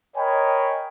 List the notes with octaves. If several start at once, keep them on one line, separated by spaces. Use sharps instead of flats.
A#4 C#5 D#5 G5 G#5 B5